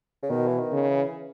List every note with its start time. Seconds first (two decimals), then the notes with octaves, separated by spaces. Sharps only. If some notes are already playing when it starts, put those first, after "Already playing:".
0.23 C#3
0.30 B2 D#3
0.47 E3
0.59 D#3
0.72 C#3
0.87 E3